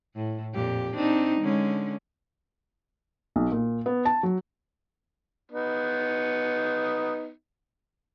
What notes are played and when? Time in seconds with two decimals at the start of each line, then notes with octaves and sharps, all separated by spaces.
0.16 A2
0.53 F2 A#2 G4
0.95 C4 D4 D#4
1.41 D3 G#3 C#4
3.36 B1
3.52 A#2
3.86 B3
4.05 A5
4.23 F#3
5.52 B3 D#4